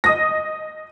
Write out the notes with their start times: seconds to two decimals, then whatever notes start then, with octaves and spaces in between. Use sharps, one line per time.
0.04 D#5 D#6 A#6